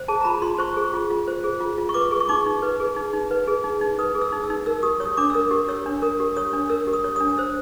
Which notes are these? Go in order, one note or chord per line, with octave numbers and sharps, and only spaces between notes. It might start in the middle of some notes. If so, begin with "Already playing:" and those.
Already playing: C5
G#4 A5
A#5
F4 B5
F4 C6
C5 C#6
G#4
F4
F4
C5
G#4
F4
F4
C#6
B4 D6
G#4
C#6
D#4 D6
D#4
B4
G#4
D#4
D#4
B4
G#4
D#4
D#4
B4 D#6
G#4
E6
D#4
E6
D#4
A#4 E6
G4 D#6
C#5 D#6
D4 D6
E6
A#4 D#6
G4
C#5 E6
D4
A#4 D#6
G4
C#5 D#6
D4
A#4 E6
G4
D#6
C#5
D4 D#6
C5 E6